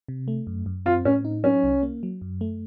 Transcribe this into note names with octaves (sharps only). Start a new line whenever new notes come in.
C3
A3
F#2
F#2
C4 F4
A2 C#4
D#4
F#3 C#4
C2
A#3
F#3
F#2
A3